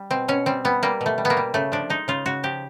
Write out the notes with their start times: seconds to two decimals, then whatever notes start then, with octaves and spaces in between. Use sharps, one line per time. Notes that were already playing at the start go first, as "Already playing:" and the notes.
Already playing: G3
0.11 B2 C4
0.28 B2 C#4
0.46 G3 C4
0.65 G3 B3
0.83 G3 A#3
1.01 B2
1.06 A3
1.18 G3
1.25 B3
1.30 A#3
1.37 G3
1.54 C#3 A3
1.72 F3 D4
1.90 G#3 D#4
2.08 C#3 F4
2.26 C#3 F#4
2.43 F3 G4